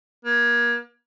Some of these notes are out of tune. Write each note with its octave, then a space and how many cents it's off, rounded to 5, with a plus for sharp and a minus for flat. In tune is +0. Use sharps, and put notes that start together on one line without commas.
A#3 +35